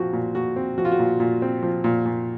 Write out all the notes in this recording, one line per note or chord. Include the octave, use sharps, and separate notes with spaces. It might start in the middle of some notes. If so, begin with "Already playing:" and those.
Already playing: A#2 F3 C4 F#4
A#2
A#2 F#4
C4
F3 F#4
F4
F#4
A#2
A#2
C4
F3
A#2
A#2